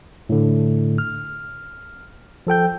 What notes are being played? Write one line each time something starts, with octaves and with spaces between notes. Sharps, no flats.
A2 D3
F6
F3 A4 G5 G6